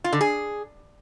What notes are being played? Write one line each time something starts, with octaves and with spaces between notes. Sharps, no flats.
F4
D3
G#4